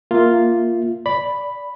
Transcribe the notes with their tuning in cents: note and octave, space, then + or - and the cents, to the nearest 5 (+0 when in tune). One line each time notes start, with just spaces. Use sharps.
A#3 +0 F4 +0 E5 +0
D5 -5 B5 +0